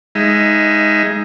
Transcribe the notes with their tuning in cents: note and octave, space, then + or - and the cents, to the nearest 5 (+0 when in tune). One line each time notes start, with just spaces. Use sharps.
G#3 +0 D#4 +15 E5 +30